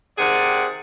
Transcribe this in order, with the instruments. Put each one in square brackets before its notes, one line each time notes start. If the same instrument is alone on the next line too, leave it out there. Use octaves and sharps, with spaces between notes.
[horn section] C3 D#3 G#4 D5 F#5